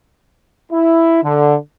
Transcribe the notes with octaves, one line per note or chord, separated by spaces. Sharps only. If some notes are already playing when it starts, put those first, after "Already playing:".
E4
D3